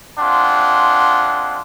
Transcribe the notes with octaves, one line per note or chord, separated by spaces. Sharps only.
G#3 C4 D4 F4 F#5 C6